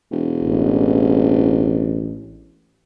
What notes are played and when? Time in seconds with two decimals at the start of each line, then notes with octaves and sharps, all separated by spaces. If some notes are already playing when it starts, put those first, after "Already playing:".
0.11 E1
0.43 A1